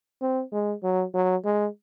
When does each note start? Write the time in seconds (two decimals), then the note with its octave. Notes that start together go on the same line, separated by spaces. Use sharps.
0.21 C4
0.52 G#3
0.83 F#3
1.14 F#3
1.45 G#3